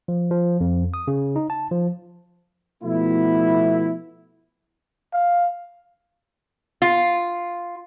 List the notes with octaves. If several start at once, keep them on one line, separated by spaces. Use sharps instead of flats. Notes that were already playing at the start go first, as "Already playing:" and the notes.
F3
F3
F2
D#6
C#3
D#4
A5
F3
B2 F3 A3 B3 E4
F5
F4